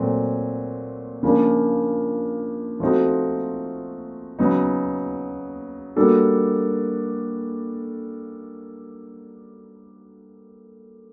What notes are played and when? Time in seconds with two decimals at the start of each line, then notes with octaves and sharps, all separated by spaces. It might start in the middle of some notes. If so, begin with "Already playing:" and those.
Already playing: A#2 F#3 A3 C4
1.23 C#3 F3 A#3 D4
2.80 F3 A3 C4 D#4 F#4
4.39 C#3 F#3 B3 D#4
5.96 G3 A#3 D4 F#4 A4